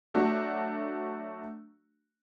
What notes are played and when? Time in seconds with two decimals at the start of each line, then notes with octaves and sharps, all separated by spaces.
0.14 F#3 A3 D4 F#4